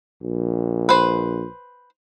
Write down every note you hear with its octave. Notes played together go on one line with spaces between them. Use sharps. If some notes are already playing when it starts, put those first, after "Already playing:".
A#1
B4 C5